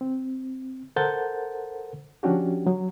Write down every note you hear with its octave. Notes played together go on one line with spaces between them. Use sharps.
C4
A4 A#4 C5 F#5 G6 A6
F3 C#4 D4 F#4 G4
F#3